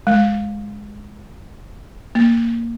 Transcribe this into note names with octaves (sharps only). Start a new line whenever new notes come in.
G#3
A#3